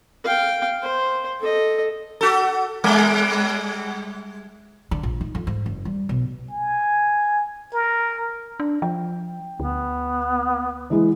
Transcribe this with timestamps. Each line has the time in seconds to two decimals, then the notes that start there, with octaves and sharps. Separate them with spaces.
0.24 F5 G5
0.82 C5
1.40 A4 D#5
2.21 F#4 A4
2.84 G3 G#3
4.91 D3
5.03 A#1
5.21 D#4
5.35 F2
5.47 G#2
5.66 F#1
5.85 G3
6.09 B1
6.51 G#5
7.74 A#4
8.60 D4
8.82 F3 G5
9.60 D2 B3
10.90 E3 G#3 E4